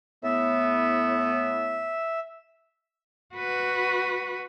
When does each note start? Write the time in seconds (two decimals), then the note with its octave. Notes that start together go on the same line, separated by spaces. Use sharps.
0.24 A2 B3 E5
3.36 F#4 B4